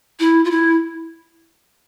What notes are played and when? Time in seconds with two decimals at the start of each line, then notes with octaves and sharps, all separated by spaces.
0.20 E4
0.45 F4
0.51 E4